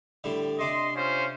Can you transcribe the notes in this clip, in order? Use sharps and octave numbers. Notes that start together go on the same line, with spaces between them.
A2 D3 G3
C3 D4 D#5 C6
C#4 F4 C5